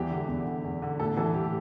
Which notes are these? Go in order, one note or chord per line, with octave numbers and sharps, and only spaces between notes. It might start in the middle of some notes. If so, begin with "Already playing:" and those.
Already playing: E2 E3 G4
D3
E2
D3
E2
D3
A2 A4
E3 A4
A2 G4